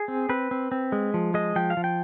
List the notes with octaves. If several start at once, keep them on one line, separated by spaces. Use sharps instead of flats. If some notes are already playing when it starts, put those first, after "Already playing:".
Already playing: G#4
C4
C4 B4
C4
C4
G#3
F3
G#3 D#5
F3 G5
F5
F3
G5